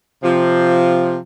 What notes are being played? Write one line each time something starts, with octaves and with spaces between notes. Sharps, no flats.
C3 F3